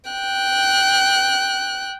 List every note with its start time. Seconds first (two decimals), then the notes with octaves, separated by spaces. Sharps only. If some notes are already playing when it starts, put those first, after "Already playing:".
0.11 G5 F#6